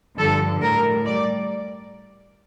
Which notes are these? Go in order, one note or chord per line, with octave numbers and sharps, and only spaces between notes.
G2 D3 F3 A4
A2 G3 A#4
G3 D5